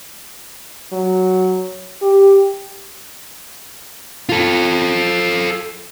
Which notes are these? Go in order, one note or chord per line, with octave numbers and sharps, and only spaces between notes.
F#3
G4
F4 A4